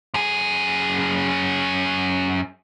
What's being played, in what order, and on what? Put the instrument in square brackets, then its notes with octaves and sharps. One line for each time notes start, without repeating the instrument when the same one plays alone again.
[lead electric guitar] F#2 G#4